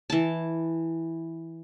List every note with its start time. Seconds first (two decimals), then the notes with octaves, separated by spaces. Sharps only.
0.10 E3 A5